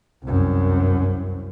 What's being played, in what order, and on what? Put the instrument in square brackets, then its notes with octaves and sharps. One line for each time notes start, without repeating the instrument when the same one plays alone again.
[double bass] C2 F#2